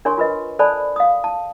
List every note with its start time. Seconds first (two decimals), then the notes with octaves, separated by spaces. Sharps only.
0.05 D4 A#4 C#5 G#5 C6 C#6
0.18 F4 A#4 B4 D#5
0.59 A4 C5 D5 G#5 A5 B5
0.96 F5 D#6
1.24 A5